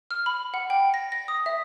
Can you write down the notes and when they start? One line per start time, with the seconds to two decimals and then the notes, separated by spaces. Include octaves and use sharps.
0.11 F6
0.26 B5
0.54 F#5
0.70 G5
0.94 A#6
1.12 A#6
1.28 D#6
1.46 E5